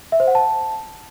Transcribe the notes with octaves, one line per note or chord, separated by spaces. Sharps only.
E5
C5
F#5
A5